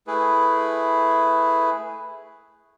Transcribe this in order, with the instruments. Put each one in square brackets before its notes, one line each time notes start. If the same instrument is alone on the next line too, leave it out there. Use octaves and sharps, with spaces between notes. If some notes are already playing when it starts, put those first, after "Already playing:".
[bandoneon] A3 E4 G#4 B4